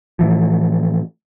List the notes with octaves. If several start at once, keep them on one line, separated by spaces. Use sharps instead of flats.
A2 E3 F3